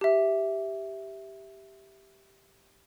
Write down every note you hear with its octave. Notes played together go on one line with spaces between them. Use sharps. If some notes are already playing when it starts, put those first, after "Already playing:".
G4 E5